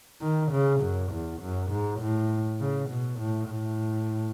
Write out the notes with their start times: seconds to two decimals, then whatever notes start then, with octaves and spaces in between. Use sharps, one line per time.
0.22 D#3
0.51 C#3
0.81 F#2
1.11 E2
1.41 F#2
1.71 G#2
2.00 A2
2.60 C#3
2.90 B2
3.19 A2
3.50 A2